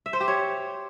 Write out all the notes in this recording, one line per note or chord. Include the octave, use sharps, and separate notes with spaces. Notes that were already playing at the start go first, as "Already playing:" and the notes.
E5
C5
G4
C#5